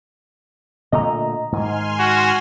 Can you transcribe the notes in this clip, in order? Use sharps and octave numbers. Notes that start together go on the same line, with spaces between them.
A#2 D3 A3 D#5 A#5
G#2 D#3 G#5 C6 F6
F#4